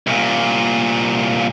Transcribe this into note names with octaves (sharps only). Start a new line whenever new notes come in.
C2 A#2